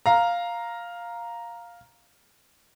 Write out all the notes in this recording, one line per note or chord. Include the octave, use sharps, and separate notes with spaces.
F5 A#5